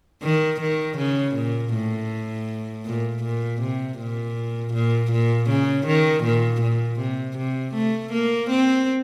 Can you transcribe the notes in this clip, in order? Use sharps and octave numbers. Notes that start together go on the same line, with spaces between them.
D#3
D#3
C#3
A#2
A2
A#2
A#2
C3
A#2
A#2
A#2
C#3
D#3
A#2
A#2
C3
C3
A3
A#3
C4